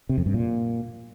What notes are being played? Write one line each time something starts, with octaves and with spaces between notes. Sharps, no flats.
C3
F2
G2
A#2